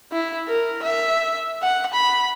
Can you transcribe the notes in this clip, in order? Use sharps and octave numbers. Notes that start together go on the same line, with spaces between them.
E4
A#4
E5
F#5
B5